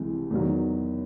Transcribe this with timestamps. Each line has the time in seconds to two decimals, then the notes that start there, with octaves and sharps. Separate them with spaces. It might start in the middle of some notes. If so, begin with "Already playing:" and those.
Already playing: C2 C3 E3 G#3
0.31 E2 D#3 F#3